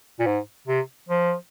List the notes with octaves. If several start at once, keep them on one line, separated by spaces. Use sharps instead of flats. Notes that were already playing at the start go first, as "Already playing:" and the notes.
A#2
G#2
C3
F3